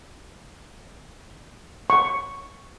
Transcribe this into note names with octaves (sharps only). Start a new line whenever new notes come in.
C#6